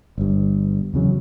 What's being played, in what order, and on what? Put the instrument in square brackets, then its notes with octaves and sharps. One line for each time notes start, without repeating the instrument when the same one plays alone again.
[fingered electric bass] G1 G2
E2 C#3 F#3